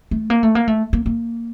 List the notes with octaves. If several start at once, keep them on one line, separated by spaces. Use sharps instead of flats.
A3
A#3
A3
A#3
A3
A#3
A#3